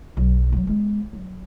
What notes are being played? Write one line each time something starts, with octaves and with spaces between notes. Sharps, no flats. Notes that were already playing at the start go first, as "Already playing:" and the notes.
B1 F#3
D#3 F#3
G#3 B3
F#3